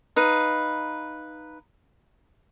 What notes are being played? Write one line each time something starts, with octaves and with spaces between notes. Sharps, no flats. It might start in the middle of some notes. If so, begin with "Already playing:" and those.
D#4 B4 F5